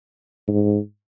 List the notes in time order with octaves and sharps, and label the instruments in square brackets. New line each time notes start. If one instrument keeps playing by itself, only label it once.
[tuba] G#2